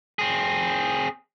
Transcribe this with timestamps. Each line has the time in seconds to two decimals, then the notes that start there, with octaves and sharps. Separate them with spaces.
0.19 C4 G#4